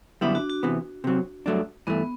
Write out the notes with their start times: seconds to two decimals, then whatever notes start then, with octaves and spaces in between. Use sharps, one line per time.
0.21 F#2 D3 G3 B3 D4 E4
0.35 F#4
0.49 F#4
0.63 C3 E3 B3
1.04 C3 F#3 C4
1.46 G2 F#3 A3 D4
1.87 G2 E3 A3 B3